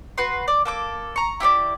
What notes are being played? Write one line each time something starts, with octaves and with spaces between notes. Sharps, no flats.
F#4 B4 C6
D5
A#3 A4 D6
A#5 C#6
E4 G4 C#5 D5